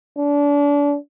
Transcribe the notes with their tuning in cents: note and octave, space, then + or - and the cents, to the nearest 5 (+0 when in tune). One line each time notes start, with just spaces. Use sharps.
D4 -30